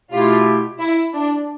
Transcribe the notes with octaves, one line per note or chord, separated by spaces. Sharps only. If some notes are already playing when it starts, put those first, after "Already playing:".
B2 A3 E4 F4 G4
E4
D4